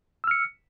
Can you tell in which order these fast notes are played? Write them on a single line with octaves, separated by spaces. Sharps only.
E6 F6 C#7